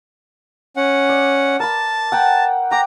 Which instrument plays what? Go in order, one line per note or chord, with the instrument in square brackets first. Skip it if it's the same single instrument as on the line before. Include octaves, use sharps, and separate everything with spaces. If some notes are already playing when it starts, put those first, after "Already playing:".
[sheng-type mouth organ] C#4 F#5
[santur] D5
[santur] A#4 B5 [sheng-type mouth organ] A5
[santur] F#5 G5 A#5
[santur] G5 D6 [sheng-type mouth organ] A#5